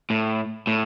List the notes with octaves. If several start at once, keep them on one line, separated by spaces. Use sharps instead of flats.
A2
A2